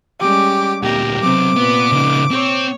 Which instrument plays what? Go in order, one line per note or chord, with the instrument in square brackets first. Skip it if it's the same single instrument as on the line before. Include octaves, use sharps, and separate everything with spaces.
[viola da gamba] G3 G#3 C#4 [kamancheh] G4 D6
[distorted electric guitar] D2 A#2 [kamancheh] G4 [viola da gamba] A#4
[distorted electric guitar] B1 F#3 [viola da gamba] C3 C4 [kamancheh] D6
[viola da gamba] A#2 B4 [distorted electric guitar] B3
[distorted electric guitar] C#3 D#4
[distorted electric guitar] C4 [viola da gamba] C#5